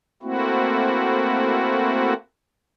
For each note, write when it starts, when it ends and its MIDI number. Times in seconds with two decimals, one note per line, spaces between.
0.23 2.14 57
0.23 2.14 58
0.23 2.14 60
0.23 2.14 64
0.23 2.14 66